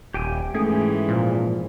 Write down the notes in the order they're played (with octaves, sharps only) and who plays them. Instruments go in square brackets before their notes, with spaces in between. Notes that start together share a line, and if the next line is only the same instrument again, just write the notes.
[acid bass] D#1 [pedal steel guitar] G4 G5 G#5
[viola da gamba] G#2 E3 [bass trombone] A3 [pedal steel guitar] C#4 G5 [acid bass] G#4
[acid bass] A#2 [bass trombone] F3